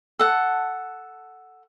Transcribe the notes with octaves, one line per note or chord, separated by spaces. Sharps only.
A4 F#5